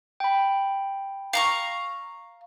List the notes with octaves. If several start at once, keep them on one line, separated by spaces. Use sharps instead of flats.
G5 B5
F5 A#5 C#6